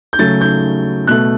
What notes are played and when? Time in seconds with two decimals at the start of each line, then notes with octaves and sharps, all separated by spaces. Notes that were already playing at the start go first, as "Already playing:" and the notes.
0.13 G6
0.19 C#3 F#3 A3 A6
0.41 G6
1.07 B2 A3 F#6